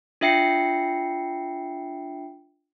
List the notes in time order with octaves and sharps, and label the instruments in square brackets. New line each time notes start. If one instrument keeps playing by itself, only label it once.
[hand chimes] D4 F4 E5 G5 C7 C#7